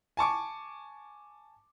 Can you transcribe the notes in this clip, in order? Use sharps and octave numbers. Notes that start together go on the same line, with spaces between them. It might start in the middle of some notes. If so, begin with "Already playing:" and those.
G#5 A5 C#6 D6